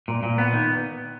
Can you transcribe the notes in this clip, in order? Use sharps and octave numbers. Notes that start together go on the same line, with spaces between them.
A#2
A#2
B3
D#3